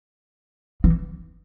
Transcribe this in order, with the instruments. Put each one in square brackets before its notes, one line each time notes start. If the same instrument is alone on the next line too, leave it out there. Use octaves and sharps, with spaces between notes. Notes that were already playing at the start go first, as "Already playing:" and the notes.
[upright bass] E3